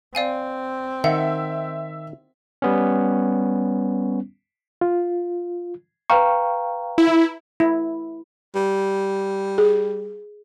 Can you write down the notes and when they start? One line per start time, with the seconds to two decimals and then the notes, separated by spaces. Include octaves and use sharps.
0.15 C4 D5 F5 G#5
1.04 D#3 E5 F#5
2.62 G3 B3 C#4
4.81 F4
6.10 B4 F5 G5 A#5 C#6
6.98 E4
7.60 E4
8.55 G3
9.58 G#4